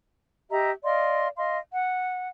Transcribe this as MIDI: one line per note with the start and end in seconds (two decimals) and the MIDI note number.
0.50 0.71 67
0.50 0.71 75
0.50 0.71 76
0.50 0.71 82
0.83 1.28 74
0.83 1.28 75
0.83 1.28 77
0.83 1.28 84
1.36 1.58 75
1.36 1.58 77
1.36 1.58 84
1.72 2.28 78